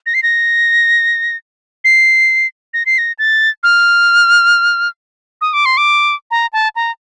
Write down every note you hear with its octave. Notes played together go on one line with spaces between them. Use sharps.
A#6
C7
A#6
C7
A#6
C7
A#6
A6
F6
D#6
D6
C6
D6
A#5
A5
A#5